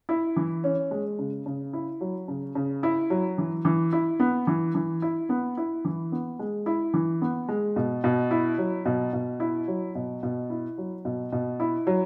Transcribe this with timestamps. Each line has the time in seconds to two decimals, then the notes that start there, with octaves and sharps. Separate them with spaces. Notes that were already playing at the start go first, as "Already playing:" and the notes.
0.09 E4
0.36 E3
0.64 C#4
0.91 G#3
1.19 C#3
1.46 C#3
1.73 E4
2.01 F#3
2.28 C#3
2.55 C#3
2.83 E4
3.10 F#3
3.38 E3
3.65 E3
3.93 E4
4.20 B3
4.47 E3
4.75 E3
5.02 E4
5.29 B3
5.57 E4
5.85 E3
6.12 B3
6.39 G#3
6.66 E4
6.94 E3
7.22 B3
7.48 G#3
7.76 B2
8.04 B2
8.31 E4
8.58 F#3
8.85 B2
9.13 B2
9.40 E4
9.68 F#3
9.95 B2
10.23 B2
10.50 E4
10.78 F#3
11.05 B2
11.32 B2
11.60 E4
11.87 F#3